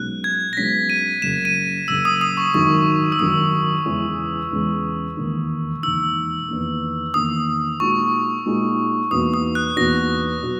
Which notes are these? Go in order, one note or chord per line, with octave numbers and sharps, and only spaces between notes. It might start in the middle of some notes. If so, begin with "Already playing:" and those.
Already playing: B1 B2 G#3 C#4 F#6
G#6
A#6
B1 B2 G#3 C#4 B6
D#7
F#1 F#2 C#3 E7
D#7
F#1 F#2 C#3 E6
D#6
D#6
C#6
G#1 F#2 D#3 F#3 C#6
E6
G#1 F#2 D#3 F#3 D#6
E2 C#3 E3 G#3 C#4
E2 C#3 E3 G#3 C#4
E1 D#2 D#3
E1 D#2 D#3 E6
E2 D#3 A#3
E2 D#3 A#3 D#6
A#2 G#3 D#4 F#4 C#6
A#2 G#3 D#4 F#4
E2 B2 A#3 D#4 F#4 D#6
D#6
F#6
E2 B2 A#3 D#4 F#4 A#6
B2 F#3